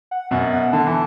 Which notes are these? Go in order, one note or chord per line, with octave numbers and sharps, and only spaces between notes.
F#5
F#2 B2 F#5
F#5
D3 A5
E3